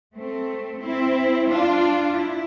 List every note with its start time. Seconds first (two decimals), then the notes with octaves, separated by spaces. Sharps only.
0.15 A3 C4
0.82 C4 E4
1.50 D4 F4
2.16 E4